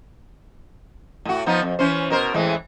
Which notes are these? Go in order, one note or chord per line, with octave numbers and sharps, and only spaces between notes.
A2 F#4
F3 B3 D#4
F2
E3 C#4 C5
B2 A#4 C5
A2 E3 G#3